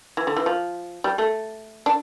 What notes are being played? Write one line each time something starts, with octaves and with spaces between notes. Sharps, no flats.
E3
D3
E3
F3
G3
A3
D4